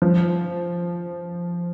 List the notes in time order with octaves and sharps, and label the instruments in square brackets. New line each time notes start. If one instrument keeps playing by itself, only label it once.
[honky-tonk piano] F3